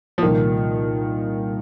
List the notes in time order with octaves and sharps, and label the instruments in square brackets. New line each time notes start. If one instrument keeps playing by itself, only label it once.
[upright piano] F3
[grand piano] C2 A#2 A#3 [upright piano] D#3